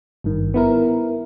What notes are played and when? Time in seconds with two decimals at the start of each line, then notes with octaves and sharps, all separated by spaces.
0.24 G#1 G2 D#3
0.54 B3 E4 A#4